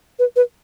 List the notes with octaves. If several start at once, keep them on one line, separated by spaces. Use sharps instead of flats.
B4
B4